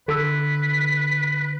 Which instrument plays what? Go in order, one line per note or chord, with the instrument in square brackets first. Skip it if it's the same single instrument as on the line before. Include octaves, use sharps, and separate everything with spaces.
[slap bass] D3 [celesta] A4 E6 [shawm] B4